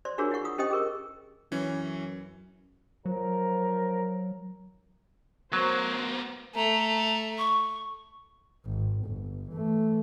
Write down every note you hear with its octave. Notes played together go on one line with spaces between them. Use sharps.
C5 D5 C6
D4 F4 F#4 G#4 A#4 C#5
E4 F#4 F#5 C#6
F4 D#6
C#4 G4 C5 D#5 G5 D#6
G#4 A#4 C#6
F#2 E3 C#4
F3 F#3 A#4
F#3 B3 F#4 A#4 C5
A3 A#5
C#6
G#1
G1
E3 A3